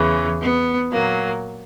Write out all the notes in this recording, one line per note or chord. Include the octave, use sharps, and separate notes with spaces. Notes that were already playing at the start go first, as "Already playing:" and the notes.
Already playing: E2 C#3 E3
B3
A#2 F#3 A#3